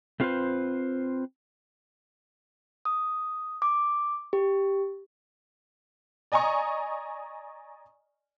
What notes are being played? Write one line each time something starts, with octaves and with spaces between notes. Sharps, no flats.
A3 C4 F4 G4 B4 C5
D#6
D6
G4
D5 D#5 G#5 A#5 C#6 D#6